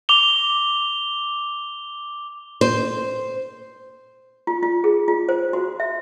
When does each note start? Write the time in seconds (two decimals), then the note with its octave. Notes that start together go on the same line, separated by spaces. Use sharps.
0.09 D6 F7 G7
2.61 C5
4.47 F4
4.63 F4
4.84 G#4
5.08 F4
5.29 C5
5.53 F#4
5.80 E5